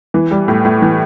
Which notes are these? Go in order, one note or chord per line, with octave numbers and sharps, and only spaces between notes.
E3
G3
A2
A2
E3